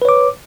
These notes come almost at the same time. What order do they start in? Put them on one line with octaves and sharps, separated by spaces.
B4 C#5 D6